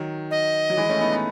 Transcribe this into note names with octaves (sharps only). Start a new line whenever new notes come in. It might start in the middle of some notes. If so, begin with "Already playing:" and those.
Already playing: D#3 F#3
D#5
F#3
E3 G#3
A3 C#4
B3 D#4
B3 D#4